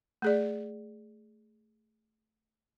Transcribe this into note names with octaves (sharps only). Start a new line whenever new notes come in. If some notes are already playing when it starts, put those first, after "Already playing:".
A3 G#4 D5